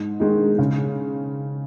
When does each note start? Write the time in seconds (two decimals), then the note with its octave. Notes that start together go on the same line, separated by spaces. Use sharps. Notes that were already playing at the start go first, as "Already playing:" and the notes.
Already playing: G#2
0.20 D#3 G#3 D#4
0.58 C#3